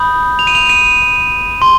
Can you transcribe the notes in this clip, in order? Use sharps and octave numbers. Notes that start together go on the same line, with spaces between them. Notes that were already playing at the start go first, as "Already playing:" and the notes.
Already playing: B5 D#6 G6
F7
D#7
F7
D#7
C6